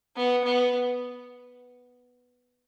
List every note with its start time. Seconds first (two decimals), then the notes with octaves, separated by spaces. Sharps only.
0.16 B3
0.45 B3